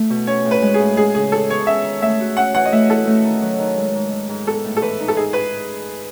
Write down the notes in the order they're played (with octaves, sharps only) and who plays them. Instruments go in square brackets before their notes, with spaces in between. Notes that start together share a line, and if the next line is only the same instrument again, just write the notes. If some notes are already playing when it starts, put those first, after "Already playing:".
Already playing: [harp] A3 E4
B2
[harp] C#4 [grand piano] C#5
[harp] A2
[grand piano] B4
[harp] G#3
[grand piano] G#4
[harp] A2
[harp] G#3 [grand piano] G#4
[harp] C#3 [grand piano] G#4
[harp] E3 [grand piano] A4
[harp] B3 [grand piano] C#5
[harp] C#4 [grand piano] E5
[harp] D#3
[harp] A3 [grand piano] E5
[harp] F#4
[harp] C#4 [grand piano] F#5
[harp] E3 [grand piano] F#5
[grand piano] D#5
[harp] A3 [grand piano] E5
[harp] E4 [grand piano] A4
[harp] A3
D#3
F#3
D#3
G#3
G#2
D#3
G#2
[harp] B3 [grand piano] A4
[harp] A2
[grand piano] A4
[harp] E3 [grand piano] B4
[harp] D#4
[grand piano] A4
[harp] D#4 [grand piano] G#4
[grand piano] B4